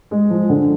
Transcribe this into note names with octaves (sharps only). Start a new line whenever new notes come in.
G#3
F3
D3